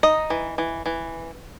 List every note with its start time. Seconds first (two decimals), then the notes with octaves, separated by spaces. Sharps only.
0.03 D#4 D#5
0.30 E3
0.58 E3
0.86 E3